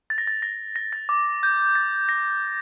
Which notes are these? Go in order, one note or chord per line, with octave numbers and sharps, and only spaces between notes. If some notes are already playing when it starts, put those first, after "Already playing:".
A6
A#6
A6
A#6
A#6
A6
D6
G6
A6
A#6